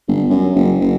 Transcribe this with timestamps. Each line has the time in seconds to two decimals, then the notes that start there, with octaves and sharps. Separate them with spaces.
0.08 G1
0.30 F#2
0.55 F#1
0.81 F#1